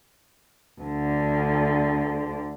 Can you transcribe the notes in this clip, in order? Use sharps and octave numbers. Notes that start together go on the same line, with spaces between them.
D2 D3